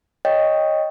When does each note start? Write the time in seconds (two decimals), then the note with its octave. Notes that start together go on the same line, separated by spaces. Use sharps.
0.25 C#5 D#5 G5